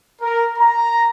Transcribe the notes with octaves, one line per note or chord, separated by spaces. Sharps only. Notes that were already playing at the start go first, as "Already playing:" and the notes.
A#4
A#5